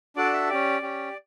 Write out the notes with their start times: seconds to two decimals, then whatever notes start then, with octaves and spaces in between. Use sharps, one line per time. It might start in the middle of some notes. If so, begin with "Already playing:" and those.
0.16 D4 F#4 A4 D5
0.33 E5
0.49 C#4 G4 D5
0.82 C#4 G4